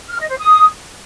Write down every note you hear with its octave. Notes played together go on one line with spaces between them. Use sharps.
F6
D#5
C5
D#6